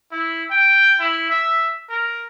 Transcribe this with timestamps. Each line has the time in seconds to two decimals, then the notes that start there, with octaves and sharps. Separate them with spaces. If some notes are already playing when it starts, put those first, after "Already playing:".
0.12 E4
0.51 G5
1.00 E4
1.30 E5
1.90 A#4